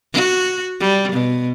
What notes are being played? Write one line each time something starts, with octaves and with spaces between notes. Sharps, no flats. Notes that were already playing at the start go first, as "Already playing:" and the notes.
F#4
G3
B2